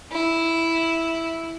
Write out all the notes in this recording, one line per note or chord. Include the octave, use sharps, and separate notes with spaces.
E4